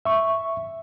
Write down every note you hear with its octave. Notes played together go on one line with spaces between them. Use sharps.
E5 C#6